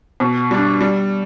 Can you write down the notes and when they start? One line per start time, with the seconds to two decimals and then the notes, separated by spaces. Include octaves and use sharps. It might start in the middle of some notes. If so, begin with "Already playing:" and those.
0.20 B2
0.51 G3 D4
0.81 G3